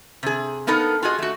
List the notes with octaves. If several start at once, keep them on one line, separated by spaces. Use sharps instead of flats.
C3 G#4
A#3 B3 D#4 A4 A#4
F4 F#4 G#4 D#5
A3 F#4